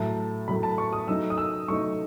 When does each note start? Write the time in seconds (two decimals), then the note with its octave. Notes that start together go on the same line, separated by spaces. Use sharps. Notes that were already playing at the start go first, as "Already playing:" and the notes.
Already playing: A2 F#3 A3 A5
0.48 A2 F#3 A3 B5
0.63 A5
0.78 C#6
0.93 D#6
1.08 F#3 A3 D#4 E6
1.30 D#6
1.38 E6
1.68 F#3 A3 D#4 C#6